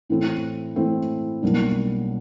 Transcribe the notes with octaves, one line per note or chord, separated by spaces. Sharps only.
A2 E3 A3 C4 E4
A2 E3 A3 C4 E4
B1 B2 G3 A#3 D4